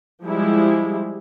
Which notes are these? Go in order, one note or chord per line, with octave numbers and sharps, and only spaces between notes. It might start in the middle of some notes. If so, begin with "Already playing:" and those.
F3 G3 G#3 E4